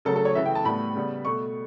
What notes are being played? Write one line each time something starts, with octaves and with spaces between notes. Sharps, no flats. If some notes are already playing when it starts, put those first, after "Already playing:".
C#3 F#3 A3 A4
A4
C#5
C#3 E3 A3 E5
G5
A5
A2 G3 B3 B5
C#3 G3 B3
B2 A3 C#6